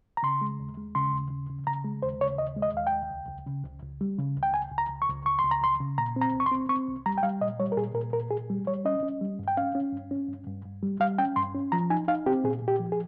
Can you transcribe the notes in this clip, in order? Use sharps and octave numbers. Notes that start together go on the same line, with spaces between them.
A#5
C#3 C6
G#3
D#2
G#3
C#3 C6
D#2
C#3
C#3
C#3 A#5
G#3
D#2 C5
C#3 C#5
D#2 D#5
G#3
D#5
D#2 F5
G5
D#2
C#2
C#2
C#3
C#2
C#2
G3
C#3
C#2
G5
C#2 G#5
C#2
A#5
C#2
C#6
C#2
C#2 C#6
C6
C#2
A#5
C#2 C6
C#3
A#2 A#5
C4
A#5
C2
C#6
C6
C4
C4 C#6
C2
G3 A#5
G5
G3 F5
A#2 D#5
G3 C#5
A#4
A#2 G#4
A#2 A#4
A#2 A#4
A#2 G#4
G3
G3 C#5
C#4 D#5
C#4
G3
G2
G5
C#4 F5
C#4
G2
C#4
G2
G2
G2
G3
G3 F5
C#4 G5
G2 C6
C#4
F3 A#5
D#4 G#5
D#4 F5
C4 G4
A#2 G#4
A#2
G4
F3
G#4